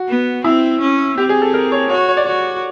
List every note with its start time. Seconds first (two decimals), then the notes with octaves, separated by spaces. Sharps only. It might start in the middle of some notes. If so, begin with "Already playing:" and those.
Already playing: F#4
0.09 B3
0.44 C4 E4
0.81 C#4
1.18 C4 G4
1.29 G#4
1.42 A4
1.54 A#4
1.72 C#5
1.89 F#4 C#5
2.09 C#5
2.17 D5
2.26 F#4 C#5